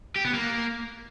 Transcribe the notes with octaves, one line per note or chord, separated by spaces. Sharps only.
G4
B3
A#3